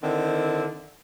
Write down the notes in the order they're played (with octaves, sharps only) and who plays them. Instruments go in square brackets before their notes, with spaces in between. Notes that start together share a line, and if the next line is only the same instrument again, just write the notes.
[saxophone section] D3 D#3 C4 E4